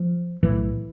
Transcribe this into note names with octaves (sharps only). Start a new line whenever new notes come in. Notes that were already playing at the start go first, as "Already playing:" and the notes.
Already playing: F3
B1 A2 E3